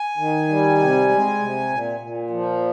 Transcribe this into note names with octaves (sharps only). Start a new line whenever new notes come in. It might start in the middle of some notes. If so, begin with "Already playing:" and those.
Already playing: G#5
D#3
G3
C3
G#3
C3
A#2
A#2
F3